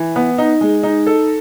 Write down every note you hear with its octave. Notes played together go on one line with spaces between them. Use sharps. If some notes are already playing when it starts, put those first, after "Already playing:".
Already playing: E3
B3
D#4
G#3
D#4
A4